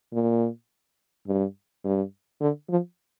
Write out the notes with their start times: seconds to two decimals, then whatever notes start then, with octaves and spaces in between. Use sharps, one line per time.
0.13 A#2
1.27 G2
1.84 G2
2.41 D3
2.70 F3